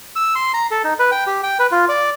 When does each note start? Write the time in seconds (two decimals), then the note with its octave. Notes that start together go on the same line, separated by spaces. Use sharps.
0.16 E6
0.35 C6
0.54 A#5
0.71 A4
0.84 D#4
0.99 B4
1.12 G5
1.27 G4
1.43 G5
1.59 B4
1.72 F4
1.89 D5